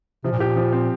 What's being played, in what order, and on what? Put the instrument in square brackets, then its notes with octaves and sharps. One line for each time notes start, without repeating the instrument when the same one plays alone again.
[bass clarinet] C3 [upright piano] F3
[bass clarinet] A#2
[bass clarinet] A2 [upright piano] G4
[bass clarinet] A#2
[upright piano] F3
C4